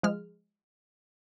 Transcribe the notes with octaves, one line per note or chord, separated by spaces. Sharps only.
F3 G#3 F6